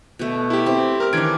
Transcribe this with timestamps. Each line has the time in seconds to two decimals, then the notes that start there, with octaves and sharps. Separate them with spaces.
0.19 B2 A3
0.50 E4 G4
0.66 C4
1.00 A#4 F6
1.13 D#3 E3 D4 G#6 D7